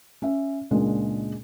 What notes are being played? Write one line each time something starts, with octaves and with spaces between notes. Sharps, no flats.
C#4 E5
C#2 A#2 G#3 D4